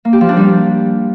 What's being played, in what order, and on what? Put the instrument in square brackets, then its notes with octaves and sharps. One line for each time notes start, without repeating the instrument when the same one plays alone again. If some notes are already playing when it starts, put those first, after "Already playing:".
[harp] A#3
G4
F3
D4
G3